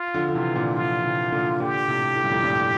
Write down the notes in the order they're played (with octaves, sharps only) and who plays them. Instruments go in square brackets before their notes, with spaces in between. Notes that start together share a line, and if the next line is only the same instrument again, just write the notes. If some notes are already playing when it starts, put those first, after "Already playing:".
Already playing: [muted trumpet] F4
[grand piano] D3 F3
D3
[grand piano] C3 E3 [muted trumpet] F4
[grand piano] A#2 D3
[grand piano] D3 F3 [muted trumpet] F4
[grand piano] C3 E3
A#2 D3
[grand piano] A#2 D3 [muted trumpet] G4
[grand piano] A2 C3
A2
G2
F2 A2
G2 A#2